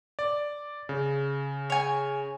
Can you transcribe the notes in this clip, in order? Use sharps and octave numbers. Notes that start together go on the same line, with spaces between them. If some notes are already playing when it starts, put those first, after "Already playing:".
D5
C#3
C#5 G#5